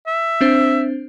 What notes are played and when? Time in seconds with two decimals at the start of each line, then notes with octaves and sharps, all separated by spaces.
0.07 E5
0.41 C4 D4 C5